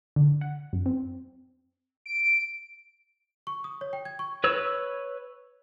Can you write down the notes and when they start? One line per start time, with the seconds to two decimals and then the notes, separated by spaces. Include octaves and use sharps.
0.16 D3
0.41 F#5
0.73 F#2
0.86 C4
2.06 D7
3.47 C#6
3.64 D#6
3.81 C#5
3.93 G5
4.05 G#6
4.19 C#6
4.44 B4 C#5 E6